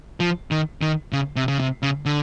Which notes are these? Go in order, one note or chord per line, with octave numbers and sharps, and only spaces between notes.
F3
D#3
D#3
C#3
C3
C#3
C3
C#3
D3